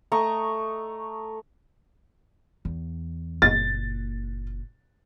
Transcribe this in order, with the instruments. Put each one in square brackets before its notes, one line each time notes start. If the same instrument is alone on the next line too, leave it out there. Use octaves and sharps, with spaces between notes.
[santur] A3 D#5 A#5 C#6
[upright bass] E2
[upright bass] F#1 A#2 [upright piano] A6